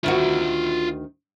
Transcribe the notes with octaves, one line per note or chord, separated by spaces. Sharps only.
D2 D#3 F4 F#4 E5